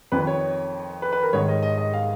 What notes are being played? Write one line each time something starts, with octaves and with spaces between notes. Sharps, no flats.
F2 D#3 B4
C#5
B4
B4
A#4
G#2 D#3 C#5
D#5
D#5
D#5
F5